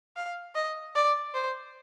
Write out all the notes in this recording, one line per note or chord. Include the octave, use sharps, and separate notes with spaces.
F5
D#5
D5
C5